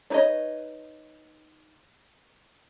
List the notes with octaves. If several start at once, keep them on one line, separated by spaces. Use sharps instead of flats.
D4 D#4 B4 C#5 D#5